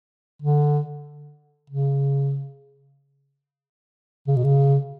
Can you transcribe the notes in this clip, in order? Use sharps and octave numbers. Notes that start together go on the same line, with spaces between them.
D3
C#3
C#3
B2
C#3